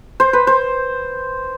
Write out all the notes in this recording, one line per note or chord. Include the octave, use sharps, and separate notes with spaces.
C5
B4
C5